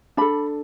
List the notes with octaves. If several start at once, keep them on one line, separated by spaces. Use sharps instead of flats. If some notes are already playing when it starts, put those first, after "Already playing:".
D4 A4 B5